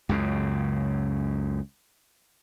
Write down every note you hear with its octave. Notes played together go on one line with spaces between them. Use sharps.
C#2 F#2 C#3